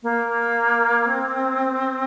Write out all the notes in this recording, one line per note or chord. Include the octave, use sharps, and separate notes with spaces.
A#3
C4